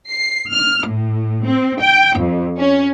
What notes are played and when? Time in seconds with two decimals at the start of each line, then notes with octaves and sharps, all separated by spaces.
0.10 C7
0.51 F6
0.87 A2
1.43 C4
1.82 G5
2.19 F2
2.58 C#4